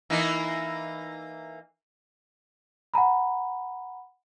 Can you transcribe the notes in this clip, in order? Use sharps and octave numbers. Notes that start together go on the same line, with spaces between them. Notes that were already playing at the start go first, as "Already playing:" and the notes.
E3 A#3 D#4
F#5 G#5 A#5 B5